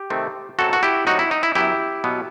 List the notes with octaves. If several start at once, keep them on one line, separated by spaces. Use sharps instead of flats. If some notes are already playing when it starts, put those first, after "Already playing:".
Already playing: G4
C3 D#3 A3 C4
F#2 F#3 C4 F#4 A4
F#4
E4 G4
A2 F#3 C4 D#4 F#4
E4
D#4
E4
F#2 F#3 B3 E4 G4
B2 F#3 B3